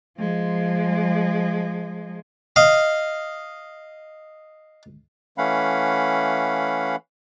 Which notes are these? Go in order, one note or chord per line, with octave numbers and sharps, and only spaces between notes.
F3 G#3
D#5 F5
E3 A3 C#4 F5 F#5 B5